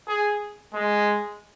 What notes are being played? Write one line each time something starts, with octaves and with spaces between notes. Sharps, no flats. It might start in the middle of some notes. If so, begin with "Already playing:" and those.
G#4
G#3